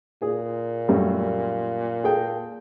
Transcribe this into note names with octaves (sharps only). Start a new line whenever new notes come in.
A#2 G#4
F#2 G3 A3
G#4 A4 G5